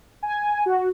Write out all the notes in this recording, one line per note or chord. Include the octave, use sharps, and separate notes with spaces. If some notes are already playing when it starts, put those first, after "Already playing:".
G#5
F#4